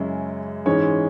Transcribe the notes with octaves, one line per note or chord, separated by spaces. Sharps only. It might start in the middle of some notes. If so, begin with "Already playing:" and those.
Already playing: F#2 C#3 G#3 C#4 E4
G#2 E3 G#3 C#4 C#5